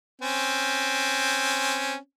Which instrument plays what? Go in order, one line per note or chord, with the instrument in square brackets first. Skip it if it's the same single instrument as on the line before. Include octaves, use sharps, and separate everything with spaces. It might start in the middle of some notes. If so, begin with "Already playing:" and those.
[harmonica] C4 C#4